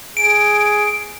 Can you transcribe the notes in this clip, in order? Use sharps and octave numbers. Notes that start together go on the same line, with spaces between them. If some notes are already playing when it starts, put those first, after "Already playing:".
G#4 D7